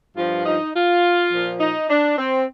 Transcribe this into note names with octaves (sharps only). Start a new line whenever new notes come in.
G2 F3 F4
D#4
F4
A#2 F3
D#4
D4
C4